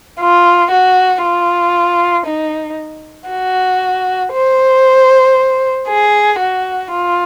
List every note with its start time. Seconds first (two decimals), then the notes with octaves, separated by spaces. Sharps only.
0.20 F4
0.71 F#4
1.24 F4
2.26 D#4
3.30 F#4
4.33 C5
5.88 G#4
6.39 F#4
6.91 F4